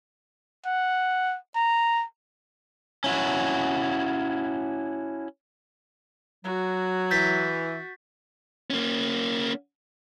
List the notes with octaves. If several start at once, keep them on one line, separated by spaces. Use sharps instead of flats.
F#5
A#5
C#4 E4 F#4
F#3 F#4
E3 G6 A6 B6
A#3 C#4